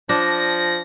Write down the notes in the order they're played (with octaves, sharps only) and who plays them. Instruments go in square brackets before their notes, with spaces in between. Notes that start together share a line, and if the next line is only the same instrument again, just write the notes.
[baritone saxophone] F3 [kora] D4 [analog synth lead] A#6